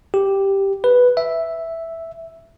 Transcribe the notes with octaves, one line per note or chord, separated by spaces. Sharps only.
G4
B4
E5